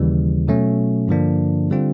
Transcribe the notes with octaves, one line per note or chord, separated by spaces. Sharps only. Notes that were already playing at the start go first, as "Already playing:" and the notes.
Already playing: D#2 C#3 E3 G3
B2 F#3 A3 C#4
G2 D3 F3 A#3 D4
D3 G3 C4 F4